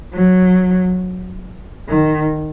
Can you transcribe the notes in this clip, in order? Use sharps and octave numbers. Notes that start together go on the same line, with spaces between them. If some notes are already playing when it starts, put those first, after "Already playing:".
F#3
D#3